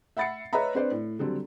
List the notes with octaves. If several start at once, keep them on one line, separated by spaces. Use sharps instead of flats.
E5 F#5 B5 A6 C7 C#7
B4 C#5 D#5 E5 A#5 B5
C4 D4 B4 C5 D5
A2
D3 F#3 G3 C4 A4